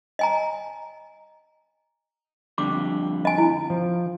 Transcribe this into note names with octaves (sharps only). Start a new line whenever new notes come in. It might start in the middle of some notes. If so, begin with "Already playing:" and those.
D#5 G#5 A#5
F2 D3 G3 D6
D#5 G#5
E4
F3